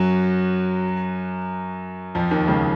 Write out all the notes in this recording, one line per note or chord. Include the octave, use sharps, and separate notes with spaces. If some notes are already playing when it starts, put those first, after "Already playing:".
Already playing: F#2 F#3
F2 F3
D#2 D#3
C#2 C#3